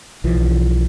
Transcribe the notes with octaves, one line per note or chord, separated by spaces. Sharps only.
B1 E3 F3